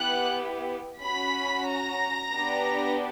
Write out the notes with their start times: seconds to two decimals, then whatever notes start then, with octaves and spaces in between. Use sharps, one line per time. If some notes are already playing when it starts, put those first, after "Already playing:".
Already playing: B3 E4 G4 F#5 F#6
1.01 C#4 F#4 B5 B6
1.68 A#5 A#6
2.35 B3 D4 G4